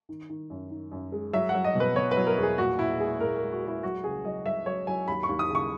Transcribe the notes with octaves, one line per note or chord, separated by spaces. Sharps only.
D#3
D#3
F#2
D#3
F#2
G#3
F#3 E5
F#3 F#5
D#5
B2
B4
B2 C#5
B4
F#3
A#4
E2 G#4
A#2 F#4
A#2 E4
G#3 G#4
A#2 A#4
A#4
G#3
F#4
G#3 E4
F#3 F#4
C#2 G#4
F#3 D#5
F#3 E5
F#3 C#5
F#3 G#5
D#2 B5
C#6
D#2
D#6
C#3
C#6